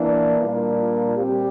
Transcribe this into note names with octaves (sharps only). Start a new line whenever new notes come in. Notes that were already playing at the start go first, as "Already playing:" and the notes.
Already playing: E3 A#3 D4
A#2 G3 A#3 D4 F4
F4
A#2 G3 C4 G4